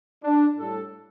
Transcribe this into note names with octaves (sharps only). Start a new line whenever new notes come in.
D4
A2 G3 A4